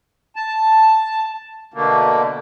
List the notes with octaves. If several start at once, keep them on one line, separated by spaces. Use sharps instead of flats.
A5
B2 D3 A3 A#3